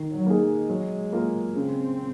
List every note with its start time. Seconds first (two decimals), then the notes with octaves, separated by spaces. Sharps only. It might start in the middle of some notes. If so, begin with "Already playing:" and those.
Already playing: D#3
0.12 F#3
0.26 A#3 D#4 G#4
0.40 G#3
0.70 F#3
1.13 A#3 F4 A#4
1.55 C#3 C4